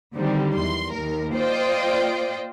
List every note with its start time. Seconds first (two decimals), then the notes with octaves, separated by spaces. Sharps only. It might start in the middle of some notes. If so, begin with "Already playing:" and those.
0.15 D3 D#3 F#3 G3 C4
0.55 E2 C6
0.91 D#2 A#4
1.34 A#3 F4 C5 D5 D#5 G5